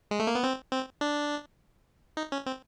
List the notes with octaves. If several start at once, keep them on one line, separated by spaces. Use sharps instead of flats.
G#3
A3
A#3
B3
C4
C4
D4
D#4
C#4
C4